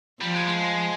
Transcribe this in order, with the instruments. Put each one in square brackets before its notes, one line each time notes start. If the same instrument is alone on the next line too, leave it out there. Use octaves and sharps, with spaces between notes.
[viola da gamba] F3 [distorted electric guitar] G3
[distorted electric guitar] G#3
G#3